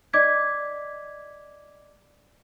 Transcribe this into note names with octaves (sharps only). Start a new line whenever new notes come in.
D5 D#5 D6 G#6 B6